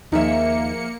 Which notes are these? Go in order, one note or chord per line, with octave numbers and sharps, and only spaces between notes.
D#2 F3 A#3 D#4 G#4 A#4 E5 C#7